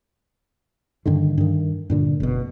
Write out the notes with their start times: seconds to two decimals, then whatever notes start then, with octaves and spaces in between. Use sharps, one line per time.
1.06 G2 D3 D#3
1.38 G2 D#3
1.90 G2 A#2 D3
2.20 F#1 B2